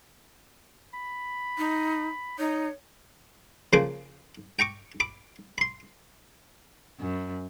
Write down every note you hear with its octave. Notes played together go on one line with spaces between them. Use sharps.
B5
D#4
D#4 C#5
C#3 F3 A#3 C5 D6
G5 A#5 C#6 D6
B5 D6
B5 C6
F#2